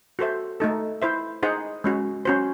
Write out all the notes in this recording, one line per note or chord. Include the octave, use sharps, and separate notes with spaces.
F#4 A4 C5 E5
A3 D#4 A4
E4 C5 E5
D#4 G#4 C5 F#5
G#3 C#4 F#4
C#4 F#4 C5